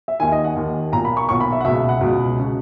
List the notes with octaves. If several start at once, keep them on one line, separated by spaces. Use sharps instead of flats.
E5
D#2 D#3 G#5
D#5
F#5
D#2 D#3
B1 A#2 A#5
B5
C#6
B1 A#2 C#6
B5
E5
F#5
C#2 B2 E5
E5
F#5
C#2 B2
C#3